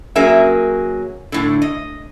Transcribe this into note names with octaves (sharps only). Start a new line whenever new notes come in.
F#3 A#3 C#4 G#4 A#4 E5
A2 D3
D#5